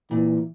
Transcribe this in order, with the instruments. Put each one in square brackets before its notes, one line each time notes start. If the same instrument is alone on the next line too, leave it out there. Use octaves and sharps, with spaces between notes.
[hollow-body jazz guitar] A#2 [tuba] E3